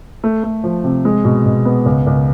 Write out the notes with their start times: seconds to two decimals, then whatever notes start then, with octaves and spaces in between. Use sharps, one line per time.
0.24 A3
0.44 A3
0.64 F3
0.84 C3
1.05 G#3
1.25 B2
1.46 B2
1.65 B3
1.86 C#2
2.07 C#2